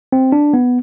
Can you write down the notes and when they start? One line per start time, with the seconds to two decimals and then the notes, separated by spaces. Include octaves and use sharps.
0.12 C4
0.32 D4
0.54 B3